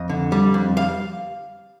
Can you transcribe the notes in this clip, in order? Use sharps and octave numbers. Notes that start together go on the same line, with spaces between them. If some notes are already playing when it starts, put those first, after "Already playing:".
Already playing: F2 D#5
D3
G3
F2
F5